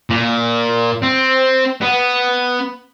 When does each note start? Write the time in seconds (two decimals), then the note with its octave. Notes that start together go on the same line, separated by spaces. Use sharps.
0.10 A#2
1.02 C4
1.81 B3